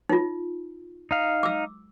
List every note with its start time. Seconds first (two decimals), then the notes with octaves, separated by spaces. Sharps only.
0.09 D#4 F4
1.11 D#4 F5
1.43 D6 E6